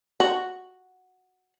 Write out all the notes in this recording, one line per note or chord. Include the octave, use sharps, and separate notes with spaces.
F#4